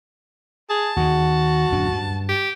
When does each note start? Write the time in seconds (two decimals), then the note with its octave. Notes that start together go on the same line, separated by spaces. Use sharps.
0.70 G#4 A5
0.97 D#2 D#3 F#4
1.72 D1 F#2 D4
1.92 G2
2.28 G4